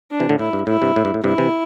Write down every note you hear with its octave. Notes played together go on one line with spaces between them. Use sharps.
D4
C3 E3
A2 D3
A2 E4
G2
A2 E4
G2 C3
A2
G2
A2
G2 C3 E4
C3 E3